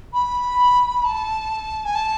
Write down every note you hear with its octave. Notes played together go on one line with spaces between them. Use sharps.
B5
A5
G#5
A5